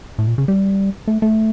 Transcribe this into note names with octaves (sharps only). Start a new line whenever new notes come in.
A2
A#2
C#3
G3
A3
A3